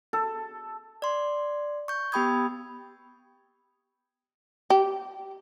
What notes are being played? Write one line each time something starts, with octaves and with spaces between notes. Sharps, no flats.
A4
D5 C6
C#6 G6
B3 G4 G5 B5 D#6 G#6
G4